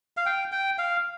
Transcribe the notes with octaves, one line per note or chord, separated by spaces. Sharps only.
F5
G5
G5
F5